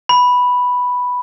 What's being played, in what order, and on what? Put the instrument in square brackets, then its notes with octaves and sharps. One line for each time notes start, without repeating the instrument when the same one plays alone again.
[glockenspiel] B5